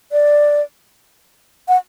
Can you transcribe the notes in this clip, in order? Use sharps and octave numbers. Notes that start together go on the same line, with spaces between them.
D5
F#5